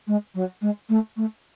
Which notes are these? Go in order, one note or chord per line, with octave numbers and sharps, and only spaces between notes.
G#3
F#3
G#3
A3
A3